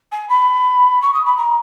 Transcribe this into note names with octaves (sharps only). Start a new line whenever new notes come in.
G#5
B5
C#6
D#6
B5
A#5